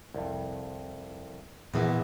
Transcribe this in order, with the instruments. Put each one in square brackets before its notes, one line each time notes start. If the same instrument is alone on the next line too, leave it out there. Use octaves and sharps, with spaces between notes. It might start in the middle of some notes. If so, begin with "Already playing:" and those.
[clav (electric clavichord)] C2 F2
[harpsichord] A#1 E2 [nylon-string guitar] A#2 E3 A#3